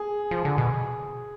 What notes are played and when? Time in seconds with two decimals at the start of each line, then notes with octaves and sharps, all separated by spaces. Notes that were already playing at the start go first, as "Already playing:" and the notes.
Already playing: G#4
0.31 F3
0.45 D3
0.58 B2